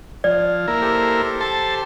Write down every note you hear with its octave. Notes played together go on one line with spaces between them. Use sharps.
F3 D5
A#3 E4 A#4
G4 A4 C5
A5 C6